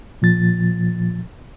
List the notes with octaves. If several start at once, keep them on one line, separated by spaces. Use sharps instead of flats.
A#2 F3 A6